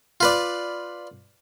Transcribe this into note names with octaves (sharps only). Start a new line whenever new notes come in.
F4 B4 D5